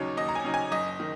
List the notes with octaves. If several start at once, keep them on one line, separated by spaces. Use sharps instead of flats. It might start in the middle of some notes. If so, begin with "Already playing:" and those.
Already playing: D#2 C#3 F#3 D#4 C#5
D#2 D#5
A#5
G#5
C#3 F#3 D#4
G#5
F#1 D#5
D#3